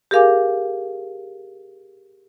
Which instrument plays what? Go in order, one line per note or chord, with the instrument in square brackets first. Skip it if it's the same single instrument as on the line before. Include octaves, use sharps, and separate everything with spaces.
[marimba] G4 G#4 A#4 F5 G#5 D6